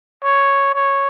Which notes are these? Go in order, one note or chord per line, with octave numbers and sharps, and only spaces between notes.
C#5
C#5